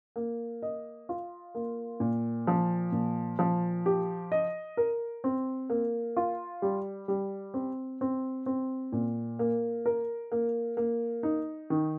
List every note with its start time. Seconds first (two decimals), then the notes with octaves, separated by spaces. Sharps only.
0.16 A#3
0.62 D#5
1.09 F4
1.55 A#3
2.00 A#2
2.47 F3
2.92 A#2
3.39 F3
3.86 G4
4.32 D#5
4.77 A#4
5.24 C4
5.70 A#3
6.17 F4
6.62 G3
7.08 G3
7.54 C4
8.01 C4
8.46 C4
8.93 A#2
9.39 A#3
9.86 A#4
10.32 A#3
10.77 A#3
11.23 D#4
11.70 D#3